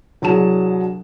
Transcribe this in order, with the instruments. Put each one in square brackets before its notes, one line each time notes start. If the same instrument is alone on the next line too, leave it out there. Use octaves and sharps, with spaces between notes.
[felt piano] C2 F#3 D4 G#4 A5 E7